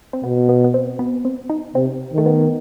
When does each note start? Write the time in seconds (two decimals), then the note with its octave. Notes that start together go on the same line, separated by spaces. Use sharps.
0.13 C4
0.24 B2 B3
0.49 B3
0.64 B3
0.74 C4
0.99 B3
1.25 C4
1.50 D#4
1.75 C3 C4
2.14 D#3 A3
2.26 B3